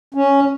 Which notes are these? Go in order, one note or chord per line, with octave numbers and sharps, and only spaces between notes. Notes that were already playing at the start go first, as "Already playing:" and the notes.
C#4